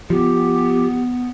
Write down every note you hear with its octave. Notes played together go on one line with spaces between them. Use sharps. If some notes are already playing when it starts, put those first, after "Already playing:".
F3 B3 G4